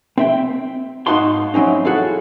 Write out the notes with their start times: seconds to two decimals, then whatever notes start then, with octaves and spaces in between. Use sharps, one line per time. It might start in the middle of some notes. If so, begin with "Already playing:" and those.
0.18 C4 E5 G5
1.07 G#2 D#4 F#4 F5 A5 C6
1.54 E3 F#3 C4 C#4 D#4
1.85 E4 F#4 G#4 A4 F5